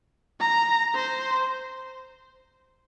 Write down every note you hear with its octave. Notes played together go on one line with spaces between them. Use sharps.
A#5
C5